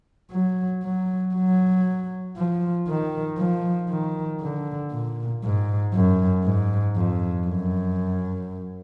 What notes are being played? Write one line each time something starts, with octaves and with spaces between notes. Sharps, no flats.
F#3
F#3
F#3
F3
D#3
F3
D#3
D3
A#2
G#2
F#2
G#2
F2
F#2